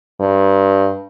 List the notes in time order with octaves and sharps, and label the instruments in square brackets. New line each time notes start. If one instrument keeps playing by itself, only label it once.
[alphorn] G2